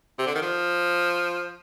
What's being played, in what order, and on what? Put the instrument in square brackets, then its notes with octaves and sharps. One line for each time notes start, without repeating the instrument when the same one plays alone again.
[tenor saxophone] C3
D3
D#3
F3